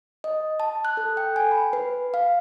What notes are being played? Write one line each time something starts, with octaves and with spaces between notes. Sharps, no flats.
D#5
A5
F#6
A4
G5
G#5
B5
B4
F5